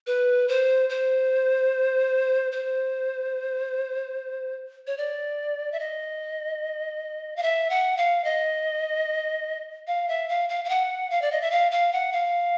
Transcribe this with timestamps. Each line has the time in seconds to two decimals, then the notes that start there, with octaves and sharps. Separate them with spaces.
0.07 B4
0.48 C5
0.89 C5
2.52 C5
4.87 C#5
4.98 D5
5.72 E5
5.80 D#5
7.36 F5
7.43 E5
7.70 F#5
7.97 F5
8.24 D#5
9.87 F5
10.08 E5
10.29 F5
10.49 F5
10.65 F5
10.69 F#5
11.10 F5
11.22 D5
11.31 D#5
11.41 E5
11.51 F5
11.71 F5
11.92 F#5
12.13 F5